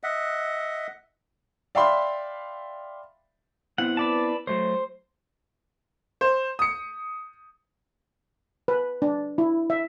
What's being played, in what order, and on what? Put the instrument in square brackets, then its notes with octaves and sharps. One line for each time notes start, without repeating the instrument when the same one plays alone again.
[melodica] D#5 E5 F#5
[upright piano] D5 E5 F5 G5 B5 C6
[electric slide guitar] B3 C4 E4 [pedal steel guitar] F#5
[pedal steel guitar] B4 D5 A5
[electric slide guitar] F#3 A3 C#5 [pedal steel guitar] C5
[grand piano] C5
D#6 C#7
[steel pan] B4
D4
E4
E5